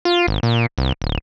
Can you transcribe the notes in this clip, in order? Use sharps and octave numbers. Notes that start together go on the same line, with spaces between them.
F4
G#1
A#2
C2
D1